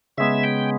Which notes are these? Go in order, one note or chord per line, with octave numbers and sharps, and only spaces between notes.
C#3 G#3 B3 E5
G5